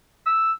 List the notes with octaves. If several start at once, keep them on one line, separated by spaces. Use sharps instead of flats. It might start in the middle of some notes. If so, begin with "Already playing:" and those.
E6